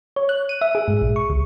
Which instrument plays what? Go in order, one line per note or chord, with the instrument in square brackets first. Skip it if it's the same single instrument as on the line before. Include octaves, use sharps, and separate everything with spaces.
[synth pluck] C#5
F#6
D#7
E5
G#4
G#2
A#1
C#6
C#2